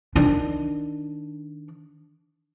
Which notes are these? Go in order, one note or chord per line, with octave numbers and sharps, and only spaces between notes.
D#3 D4